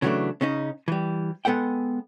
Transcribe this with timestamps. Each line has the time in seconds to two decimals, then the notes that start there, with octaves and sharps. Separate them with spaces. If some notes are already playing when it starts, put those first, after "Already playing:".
0.02 C#3 E3 F#3 G3 A3 D4
0.41 C#3 C#4 D#4
0.88 E3 G3
1.45 G#3 B3 A4 F#5 G5